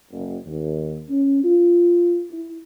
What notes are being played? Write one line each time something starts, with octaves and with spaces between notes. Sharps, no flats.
F#1
D#2
C#4
F4
E4